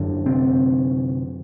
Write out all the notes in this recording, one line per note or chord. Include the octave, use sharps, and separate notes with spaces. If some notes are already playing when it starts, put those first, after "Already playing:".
Already playing: F#2 D3
C3 C4